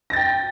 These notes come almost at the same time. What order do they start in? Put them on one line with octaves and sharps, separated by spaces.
A#6 A6 G5